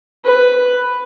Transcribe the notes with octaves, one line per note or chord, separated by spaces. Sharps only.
B4